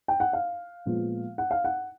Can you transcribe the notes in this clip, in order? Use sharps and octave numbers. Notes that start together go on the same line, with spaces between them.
G5
F#5
F5
A#2 F3 G#3 B3
F#5
F5
F#5